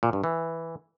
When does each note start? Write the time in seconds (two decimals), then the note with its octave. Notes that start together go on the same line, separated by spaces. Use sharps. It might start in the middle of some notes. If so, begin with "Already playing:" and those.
0.03 A#2
0.13 G2
0.24 E3